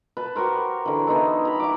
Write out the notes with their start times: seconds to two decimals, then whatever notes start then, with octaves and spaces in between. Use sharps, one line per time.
0.17 B4 A5
0.36 F#4 G4 A#4 C5
0.86 D3 E3
1.07 E3 B3 D#4 A4
1.45 A#5 B5
1.60 E4 F#5 D6